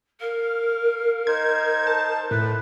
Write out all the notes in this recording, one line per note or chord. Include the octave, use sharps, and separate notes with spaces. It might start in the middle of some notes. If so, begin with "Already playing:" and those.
A#4 F5
D#4 C5 G#6
A5
A2 B4